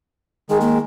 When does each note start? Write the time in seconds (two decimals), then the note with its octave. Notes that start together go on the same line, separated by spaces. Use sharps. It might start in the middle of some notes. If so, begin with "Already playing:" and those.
0.50 D#3 G#3 G#4
0.61 A#3